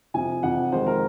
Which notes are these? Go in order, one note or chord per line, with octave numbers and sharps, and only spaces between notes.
F2 C3 F3 G#5
F2 C3 F3 F#5
F2 D#3 G#3 C5
A#4